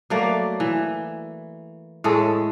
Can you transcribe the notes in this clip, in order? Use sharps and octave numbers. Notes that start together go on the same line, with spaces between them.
F#3 A3 A#3 D5
E3
A2 G#3 A3 A4